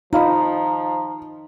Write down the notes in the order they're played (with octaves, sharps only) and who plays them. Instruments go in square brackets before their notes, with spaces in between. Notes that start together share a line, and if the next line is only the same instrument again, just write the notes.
[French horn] F3 [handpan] D#4 [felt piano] F4 F5 B5 [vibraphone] A#5